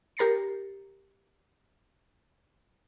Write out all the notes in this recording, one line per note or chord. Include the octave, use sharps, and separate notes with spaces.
G4 A#4 A#5 A6 C7 C#7